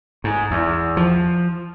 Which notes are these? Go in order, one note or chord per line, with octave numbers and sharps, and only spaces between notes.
G#2
E2
F3